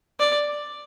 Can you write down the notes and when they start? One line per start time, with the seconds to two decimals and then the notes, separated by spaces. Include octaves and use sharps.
0.19 D5